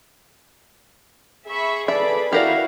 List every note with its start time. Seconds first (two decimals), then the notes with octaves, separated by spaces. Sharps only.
1.49 G#4 E5 B5 C#6
1.88 A4 B4 D5 E5 B5
2.33 E4 F#4 G4 A#4 D5 F5